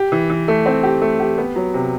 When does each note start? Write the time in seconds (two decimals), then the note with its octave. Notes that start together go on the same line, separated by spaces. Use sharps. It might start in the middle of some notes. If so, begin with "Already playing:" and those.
Already playing: G4
0.12 E3
0.30 E3
0.48 A3
0.66 C4
0.83 G4
1.02 A3
1.20 G4
1.38 B3
1.56 F#3
1.74 C3